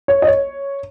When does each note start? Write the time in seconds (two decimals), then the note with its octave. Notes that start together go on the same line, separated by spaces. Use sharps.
0.08 C#5
0.22 D#5
0.27 C#5